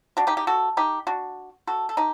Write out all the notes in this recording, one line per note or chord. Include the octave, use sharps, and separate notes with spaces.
D4 F#4
D#4 G4
D#4 G4
F#4 A4
D#4 G4
D4 F#4
F#4 A4
A4
D#4 G4